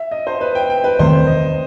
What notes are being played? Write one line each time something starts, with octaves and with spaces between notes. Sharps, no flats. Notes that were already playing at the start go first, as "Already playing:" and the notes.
Already playing: E5
D#5
C5
B4
G5
G5
B4
E2 D#3 A3 C4 C5
D#5